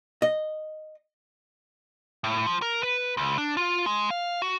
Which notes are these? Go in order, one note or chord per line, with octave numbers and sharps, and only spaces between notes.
D#5
A2
F3
A#4
B4
C#2
D4
F4
G#3
F5
F#4